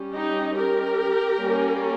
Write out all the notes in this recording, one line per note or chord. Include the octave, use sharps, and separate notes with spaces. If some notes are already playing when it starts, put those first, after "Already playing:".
Already playing: G3 C#4
D#4 G4
G4 A#4
G3 A#3 C#4